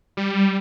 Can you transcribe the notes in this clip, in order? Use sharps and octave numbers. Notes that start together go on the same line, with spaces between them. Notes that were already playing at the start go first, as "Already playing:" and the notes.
G3